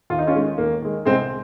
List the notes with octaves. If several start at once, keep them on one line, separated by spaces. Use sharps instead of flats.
D#2 F4
D#4
C#4 F4
D#3 G#3
D#2 A#3
D#3 G#3
C2 G#3 C4